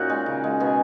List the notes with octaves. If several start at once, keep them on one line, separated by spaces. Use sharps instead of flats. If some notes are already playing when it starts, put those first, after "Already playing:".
Already playing: A#2 C#4 D#4 F#4
G#3
C#3
G#3
B2 G#4